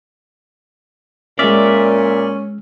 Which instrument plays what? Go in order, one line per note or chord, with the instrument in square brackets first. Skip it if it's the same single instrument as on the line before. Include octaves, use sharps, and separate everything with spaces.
[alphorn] A#2 [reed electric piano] G#3 E6 F6 [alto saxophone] C#4 [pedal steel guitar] D5 E5